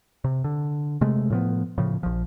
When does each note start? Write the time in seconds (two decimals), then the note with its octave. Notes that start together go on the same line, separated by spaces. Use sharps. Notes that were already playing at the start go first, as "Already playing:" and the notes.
0.24 C3
0.44 D3
1.01 C3 G#3 A3
1.30 A2 F3 B3
1.78 A2 C#3 F3
2.03 A#1 F3